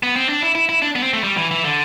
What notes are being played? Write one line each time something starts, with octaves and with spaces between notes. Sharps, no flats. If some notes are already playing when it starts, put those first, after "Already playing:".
B3
C4
D4
E4
E4
E4
D4
B3
C4
A3
G3
E3
E3
D3